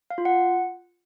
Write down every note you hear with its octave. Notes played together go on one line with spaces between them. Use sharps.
F5
F4
F#5